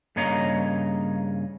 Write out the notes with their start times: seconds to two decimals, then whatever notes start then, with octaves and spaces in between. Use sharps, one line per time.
0.16 G2 C#3 A#3 C#5 D#5 A#5